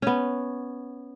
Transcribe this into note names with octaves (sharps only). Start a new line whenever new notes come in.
B3 C#4